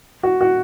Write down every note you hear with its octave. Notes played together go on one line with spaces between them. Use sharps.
F#4
F#4